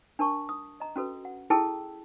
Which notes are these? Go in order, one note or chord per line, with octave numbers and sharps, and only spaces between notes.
D4 A#4 A5 C#6
D#6
D#5 A#5
C#4 F#4 A4 B4
F#5
E4 G#4 A4 G5 A5 E6